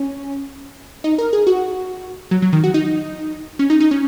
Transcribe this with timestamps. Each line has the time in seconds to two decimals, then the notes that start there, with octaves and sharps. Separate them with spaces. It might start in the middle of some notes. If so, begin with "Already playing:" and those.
Already playing: C#4
1.04 D#4
1.18 A#4
1.33 G#4
1.47 F#4
2.31 F#3
2.42 F#3
2.53 D#3
2.64 F#4
2.74 D#4
3.59 C#4
3.70 D#4
3.80 D#4
3.91 C#4